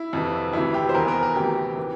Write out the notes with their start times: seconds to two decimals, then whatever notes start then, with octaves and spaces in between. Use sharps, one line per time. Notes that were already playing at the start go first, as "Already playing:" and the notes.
Already playing: E4
0.13 F2 C3 E3
0.53 D2 C3 E3 E4
0.74 G4
0.89 C5
0.94 E2 E3 A#4
1.08 A#4
1.23 A#4
1.35 D2 C3 E3 G4
1.77 E3